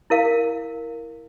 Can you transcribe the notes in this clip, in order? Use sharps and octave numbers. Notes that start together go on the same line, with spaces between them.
E4 A#4 F5